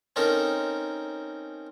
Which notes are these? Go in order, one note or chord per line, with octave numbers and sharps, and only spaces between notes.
C4 C#4 D#4 A4 A#4